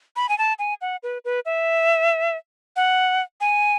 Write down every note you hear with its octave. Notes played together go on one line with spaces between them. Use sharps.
B5
G#5
A5
G#5
F#5
B4
B4
E5
F#5
G#5